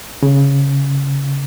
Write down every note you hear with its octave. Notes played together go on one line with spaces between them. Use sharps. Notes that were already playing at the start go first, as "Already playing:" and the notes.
C#3